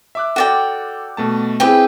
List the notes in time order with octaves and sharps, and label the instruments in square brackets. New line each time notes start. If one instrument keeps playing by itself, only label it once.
[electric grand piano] E5 D6 F#6
[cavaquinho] F#4 D5 G5 [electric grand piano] A4
[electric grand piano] B2 A3 A5
[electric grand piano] C4 E4 G#4 [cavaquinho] G4 B4 G5